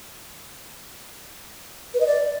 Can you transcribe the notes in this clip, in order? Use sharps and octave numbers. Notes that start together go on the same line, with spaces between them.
B4
D#5
D5